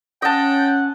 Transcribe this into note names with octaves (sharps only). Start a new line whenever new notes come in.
C#4 D#5 F#5 G5 A5